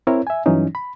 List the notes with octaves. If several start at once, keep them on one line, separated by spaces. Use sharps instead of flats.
C4 E4 A#4 C#5
E5 G#5
G2 E3 F#3 C#4 D#4
B5